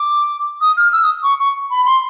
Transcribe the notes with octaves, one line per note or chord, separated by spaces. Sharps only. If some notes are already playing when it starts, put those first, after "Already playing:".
Already playing: D6
D#6
F6
E6
D#6
C#6
C#6
B5
C6